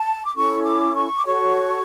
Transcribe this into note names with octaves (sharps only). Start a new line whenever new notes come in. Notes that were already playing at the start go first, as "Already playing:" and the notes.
Already playing: A5
D6
C#4 E4 A4 C#6
D6
C#6
D6
F#4 A4 C#5 C#6